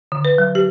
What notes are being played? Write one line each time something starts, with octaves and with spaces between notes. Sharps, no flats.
D3
B4
F#3
G4